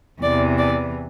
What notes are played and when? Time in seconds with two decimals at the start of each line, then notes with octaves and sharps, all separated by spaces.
0.23 E2 C3 E3 D5
0.58 D5